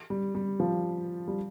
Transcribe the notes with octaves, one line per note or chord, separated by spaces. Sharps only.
G3
G3
F3
G3